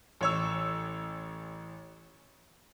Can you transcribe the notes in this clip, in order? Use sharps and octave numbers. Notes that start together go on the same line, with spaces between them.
A1 C#5 E6